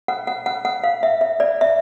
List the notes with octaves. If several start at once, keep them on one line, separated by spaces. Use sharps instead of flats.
F#5
F#5
F#5
F#5
F5
E5
E5
D5
E5